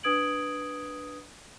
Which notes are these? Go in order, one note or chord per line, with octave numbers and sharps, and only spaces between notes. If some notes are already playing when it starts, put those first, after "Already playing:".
D4 B4 D#6 G#6 D7 F#7